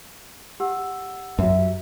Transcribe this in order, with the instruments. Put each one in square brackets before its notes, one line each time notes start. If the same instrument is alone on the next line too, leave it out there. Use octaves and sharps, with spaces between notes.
[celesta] G4 F#5 E6
[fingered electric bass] F#2 F#3 [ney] E5